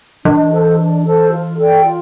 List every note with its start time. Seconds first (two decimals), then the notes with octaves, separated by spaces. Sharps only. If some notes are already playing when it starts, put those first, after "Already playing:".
0.25 E3 D4
0.52 A4 C5
0.78 D4
1.05 A4 C5
1.31 F4
1.57 A4 D5 G5
1.84 F4